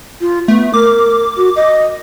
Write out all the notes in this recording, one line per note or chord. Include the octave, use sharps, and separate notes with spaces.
F4
A3 B3
A#4 D6
F#4
D#5